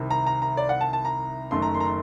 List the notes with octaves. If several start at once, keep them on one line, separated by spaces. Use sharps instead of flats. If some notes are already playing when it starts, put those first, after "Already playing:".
Already playing: C2 C3 D#3
A#5
A#5
A#5
D5
F#5
A5
A5
A#5
F#1 F#2 D#3 A3 C6
A#5
C6
A#5
C6